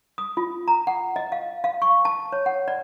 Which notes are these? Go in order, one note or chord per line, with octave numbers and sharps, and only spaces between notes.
D#6
F4
A#5
F#5
D#5
F5
F5
C#6
A5
C#5
F#5
D5